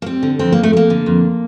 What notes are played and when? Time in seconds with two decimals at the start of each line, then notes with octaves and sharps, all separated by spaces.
0.02 A#3
0.06 G3 C4
0.23 D3
0.39 F2 C4
0.52 F2 A#3
0.63 A3
0.73 G3
0.77 A#3
0.90 D3
1.06 F2